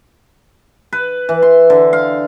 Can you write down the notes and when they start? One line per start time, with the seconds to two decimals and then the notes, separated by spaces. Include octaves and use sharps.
0.93 B4
1.29 E3
1.42 C6
1.70 D3
1.93 F5